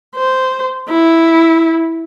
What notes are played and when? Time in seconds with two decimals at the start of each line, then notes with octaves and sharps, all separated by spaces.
0.16 C5
0.89 E4